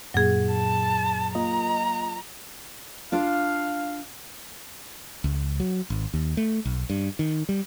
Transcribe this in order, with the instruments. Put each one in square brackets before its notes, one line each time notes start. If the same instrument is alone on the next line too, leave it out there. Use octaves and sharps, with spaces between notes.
[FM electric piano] F#2 A#2 [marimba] F#3 G#4
[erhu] A5
[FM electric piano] A#3 F4 D#5 [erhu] A#5
[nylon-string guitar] D4 F4 [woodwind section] F5
[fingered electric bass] C#2
F#3
G#1
D#2
A3
B1
G2
D#3
G3